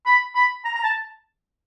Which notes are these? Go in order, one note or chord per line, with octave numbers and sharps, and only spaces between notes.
B5
B5
A#5
A#5
A5